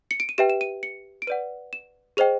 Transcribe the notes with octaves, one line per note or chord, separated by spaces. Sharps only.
C#7
D7
D#7
G4 B4 E5 G5 E7
E7
D#7
C#7
D7
B4 D5 F#5 D#7
E7
G#4 C5 D#5 G5 F7